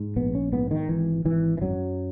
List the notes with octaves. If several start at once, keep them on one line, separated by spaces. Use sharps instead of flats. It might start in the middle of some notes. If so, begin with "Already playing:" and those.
Already playing: G#2
A#1 B3
C#4
G#2 B3
D#3
G#1 E3
G#1 E3
E3
F#2 F#3